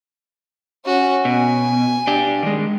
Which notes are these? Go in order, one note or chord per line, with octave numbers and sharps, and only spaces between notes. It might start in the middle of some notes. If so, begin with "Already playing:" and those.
C#4 F#4
B2 G#5
D4 G4
D#3 G#3